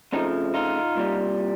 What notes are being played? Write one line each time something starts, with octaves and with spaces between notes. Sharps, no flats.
F2 C#3 F3 A3 C#4 D#4
D#4 F4
C2 A#2 G3